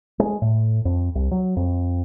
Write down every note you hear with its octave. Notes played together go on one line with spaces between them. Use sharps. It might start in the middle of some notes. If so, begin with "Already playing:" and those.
G#3
A2
F2
C2
F#3
F2